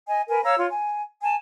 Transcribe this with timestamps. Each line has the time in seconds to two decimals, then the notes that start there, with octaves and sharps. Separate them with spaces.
0.07 D#5 G#5
0.29 A#4 B4 G#5
0.43 C#5 F5 A#5 E6
0.58 F4 C#5 C6
0.70 G#5
1.22 G#5 A5